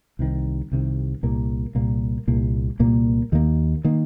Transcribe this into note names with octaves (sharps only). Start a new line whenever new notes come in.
C2 C3 D#3
C2 C3 D#3
C2 A#2 A#3
C2 A#2 A#3
C2 A#2 A#3
C2 A#2 A#3
D#2 D#3 A#3
D#3 A#3